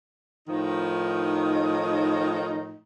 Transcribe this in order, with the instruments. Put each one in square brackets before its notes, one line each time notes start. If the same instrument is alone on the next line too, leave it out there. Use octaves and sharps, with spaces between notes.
[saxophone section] A2 D#3 F3 D#4